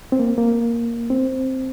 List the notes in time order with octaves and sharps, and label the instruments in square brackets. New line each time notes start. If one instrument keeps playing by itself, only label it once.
[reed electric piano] C4
A#3
A#3
C4